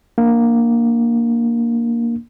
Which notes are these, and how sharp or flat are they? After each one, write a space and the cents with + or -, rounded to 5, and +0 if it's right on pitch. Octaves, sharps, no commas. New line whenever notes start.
A#3 +0 D4 +10